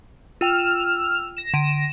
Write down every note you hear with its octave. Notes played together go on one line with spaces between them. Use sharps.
F4 G5 E6 F6 F7
A#6 E7
D3 D7 D#7